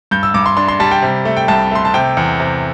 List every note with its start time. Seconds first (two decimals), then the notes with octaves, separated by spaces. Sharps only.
0.11 G2 G6
0.23 E6
0.34 G2 D6
0.46 C6
0.57 D4 C6
0.68 C6
0.80 G3 A5
0.91 G5
1.02 C3
1.25 A3
1.37 G5
1.48 C2 A5
1.71 A3 C6
1.85 A5
1.94 C3 G5
2.17 E2
2.40 C3